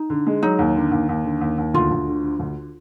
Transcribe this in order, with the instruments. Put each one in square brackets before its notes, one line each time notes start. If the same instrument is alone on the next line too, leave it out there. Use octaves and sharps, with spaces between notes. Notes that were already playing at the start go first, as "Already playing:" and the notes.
Already playing: [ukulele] D#4
[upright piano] D3
G#3
[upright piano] F#3 [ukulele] D#4
[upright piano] D#2
D3
D#2
D#2
D3
D#2
D#2
[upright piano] D2 [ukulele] F4
[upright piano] D2
D3
D3
D2